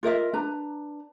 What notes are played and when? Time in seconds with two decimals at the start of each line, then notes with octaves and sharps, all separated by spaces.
0.03 F4 A#4 D#5 E5
0.33 D4 B4 A#5